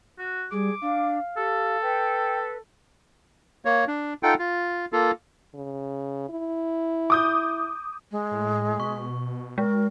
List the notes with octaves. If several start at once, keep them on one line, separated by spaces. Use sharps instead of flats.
F#4
G3 G#4 D6
D4 F5
G4 A4
B4 G5
A#3 C#5
D4
D#4 F4 A4 F#5 G5
F4
A#3 F4 A4
C#3
E4
D6 D#6 G6
G#3
A2
B2 C#6
G#3 A#4